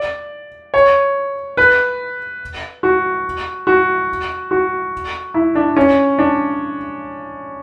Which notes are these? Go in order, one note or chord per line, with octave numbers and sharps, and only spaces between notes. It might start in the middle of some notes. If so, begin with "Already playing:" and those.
Already playing: D5
C#5
B4
F#4
F#4
F#4
E4
D4
C#4
D4